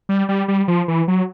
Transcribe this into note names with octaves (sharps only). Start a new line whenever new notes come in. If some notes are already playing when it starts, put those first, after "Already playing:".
G3
G3
G3
F3
E3
F#3